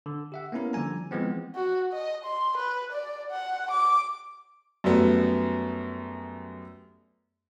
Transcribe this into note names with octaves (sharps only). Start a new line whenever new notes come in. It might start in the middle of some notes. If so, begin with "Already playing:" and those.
D3
G4 E5 F#5
A#3 B3 C#4 E4 A#4
D3 F3 G3 G#5 A#5
E3 F3 G#3 B3 C4
F#4
D#5
C6
B4
D5
F#5
D6
F#2 G3 A3 B3